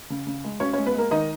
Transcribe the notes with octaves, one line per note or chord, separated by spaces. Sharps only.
C#3
C#3
G#3
B1 C#4 C#5
C#4 C#5
G#3
B3 B4
G#3 A#3 A#4
D#3 D#4 D#5